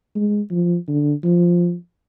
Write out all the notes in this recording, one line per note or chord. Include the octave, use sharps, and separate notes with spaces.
G#3
F3
D3
F3